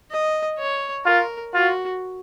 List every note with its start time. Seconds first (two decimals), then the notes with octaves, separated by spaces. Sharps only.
0.11 D#5
0.58 C#5
1.06 F4 A#4
1.54 F4 F#4